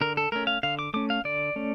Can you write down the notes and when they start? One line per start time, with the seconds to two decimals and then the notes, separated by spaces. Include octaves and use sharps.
0.01 D3 A#4
0.17 A4
0.32 A3 C#4 A#4
0.47 F5
0.63 D3 F5
0.79 D6
0.94 A3 C#4 D6
1.10 F5
1.24 D3 D5
1.56 A3 C#4